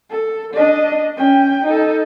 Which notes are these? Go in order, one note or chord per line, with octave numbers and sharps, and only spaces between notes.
A4
D4 D#5
C#4 G5
D#4 A4